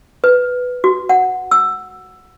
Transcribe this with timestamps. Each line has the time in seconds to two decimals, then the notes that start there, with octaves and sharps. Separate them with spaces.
0.24 B4
0.84 F#4
1.09 F#5
1.51 E6